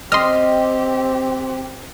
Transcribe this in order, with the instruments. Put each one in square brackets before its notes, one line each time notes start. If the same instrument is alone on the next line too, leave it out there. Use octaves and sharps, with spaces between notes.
[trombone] C4 [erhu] G4 [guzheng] D#5 [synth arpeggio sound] C6 F6